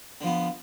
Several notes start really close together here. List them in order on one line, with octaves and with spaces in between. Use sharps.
D3 F3 B3